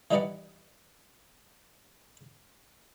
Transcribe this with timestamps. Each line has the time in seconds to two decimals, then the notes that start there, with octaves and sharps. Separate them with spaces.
0.11 E3 G3 D#4 B4 D5 F#5